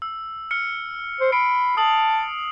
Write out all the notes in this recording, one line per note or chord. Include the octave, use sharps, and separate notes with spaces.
E6
F6 C#7
C5
B5 C7 D7
A5 D#6 F#7